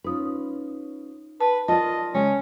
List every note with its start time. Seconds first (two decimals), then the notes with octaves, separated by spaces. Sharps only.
0.04 C#4 D#4 F4 B4 D#6
1.41 B4 A5
1.68 F4 A#4 D5 D#5 A5
2.14 C#3 G#3 C#4 G5